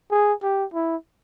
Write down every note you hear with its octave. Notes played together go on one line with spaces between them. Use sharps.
G#4
G4
E4